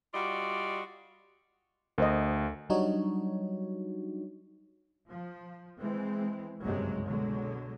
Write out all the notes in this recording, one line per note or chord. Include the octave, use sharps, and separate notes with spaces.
G3 F4 F#4 D5 D#5
D2 A#4 C5 D#5
F#3 G3 D4 D#4 F#4 C#5
F3
E3 G#3 C4
F#1 C2 G2 C3 F#3 G#3
B2 D3 F#3 G#3